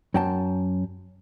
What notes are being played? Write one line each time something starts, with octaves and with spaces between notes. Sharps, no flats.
F#2 G5 A5